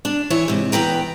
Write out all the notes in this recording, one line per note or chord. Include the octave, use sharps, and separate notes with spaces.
D4
E3 E4 C#5
G#2 C3
E2 B4 G5 A#5